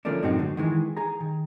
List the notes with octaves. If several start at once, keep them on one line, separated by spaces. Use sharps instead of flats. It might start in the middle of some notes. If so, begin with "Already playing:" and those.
D3 F3 A3 A#3 C#4 D4
F#2 A2 G#3 C4 D#4 F#4
D3
D#3 E3 G#3
G#4 A#5
D#3